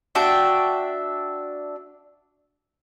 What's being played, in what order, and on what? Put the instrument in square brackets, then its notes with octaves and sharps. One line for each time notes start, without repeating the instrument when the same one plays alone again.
[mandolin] D4 F#4 E5 G5